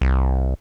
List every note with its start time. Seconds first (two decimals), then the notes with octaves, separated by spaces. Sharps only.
0.01 C2